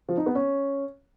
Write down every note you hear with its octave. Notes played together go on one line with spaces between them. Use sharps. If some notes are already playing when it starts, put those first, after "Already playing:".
F3
D#4
B3
C#4